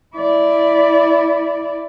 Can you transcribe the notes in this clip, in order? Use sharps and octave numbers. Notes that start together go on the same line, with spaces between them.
E4 D5